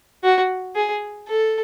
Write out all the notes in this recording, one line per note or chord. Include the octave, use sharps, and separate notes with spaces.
F#4
G#4
A4